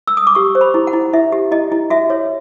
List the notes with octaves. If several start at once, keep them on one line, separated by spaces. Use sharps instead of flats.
E6
D#6
D6
G4 C#6
C5
B5
E4
F#5
E4
E4 E5
G4
E4 D#5
E4
F#4 E5
C#5